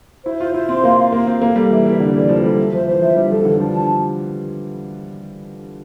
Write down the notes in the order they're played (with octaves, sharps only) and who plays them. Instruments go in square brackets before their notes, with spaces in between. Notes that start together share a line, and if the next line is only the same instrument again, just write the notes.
[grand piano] E4 [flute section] C5
[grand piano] F4 [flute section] C5
[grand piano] E4 [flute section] C5
[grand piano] C4 [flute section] C6
[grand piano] A#3 [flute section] F5
[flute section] F5
[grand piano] A#3 [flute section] F5
[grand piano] C4 [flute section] F5
[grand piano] A#3 [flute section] A4
[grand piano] G3 [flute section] A4
[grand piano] E3 [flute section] E5
[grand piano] E3 [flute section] A4
[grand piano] D3 [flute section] D5
[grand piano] E3 [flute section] A4
[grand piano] F3 [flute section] A4
[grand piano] G3 [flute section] A4
[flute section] E5
[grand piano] F3 [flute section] C5
[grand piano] E3 [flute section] C5
[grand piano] F3 [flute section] E5
[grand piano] G3 [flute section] D4
[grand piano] F3 [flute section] A4
[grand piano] E3
[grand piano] D3 [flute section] D4
[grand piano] F3 [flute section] D4
[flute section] A5